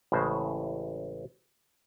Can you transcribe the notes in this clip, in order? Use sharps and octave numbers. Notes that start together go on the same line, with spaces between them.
A1 A2 C#3 G#3 C5